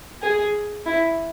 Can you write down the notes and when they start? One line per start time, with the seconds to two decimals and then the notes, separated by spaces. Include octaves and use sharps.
0.22 G#4
0.86 E4